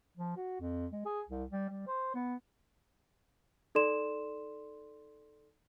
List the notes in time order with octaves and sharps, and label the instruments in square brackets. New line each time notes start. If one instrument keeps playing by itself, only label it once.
[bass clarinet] F3
F#4
F2
G#3
G#4
C2
G3
G3
C5
B3
[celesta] D#4 A4 D5 C6 E7